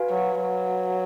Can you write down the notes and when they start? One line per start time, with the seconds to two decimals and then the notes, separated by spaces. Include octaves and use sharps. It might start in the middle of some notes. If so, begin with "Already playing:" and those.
Already playing: F#4 B4 F5 G#5
0.09 F#3
0.41 F#3